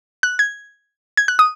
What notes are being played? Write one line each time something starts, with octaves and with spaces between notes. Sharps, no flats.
F#6
G#6
G#6
F#6
D#6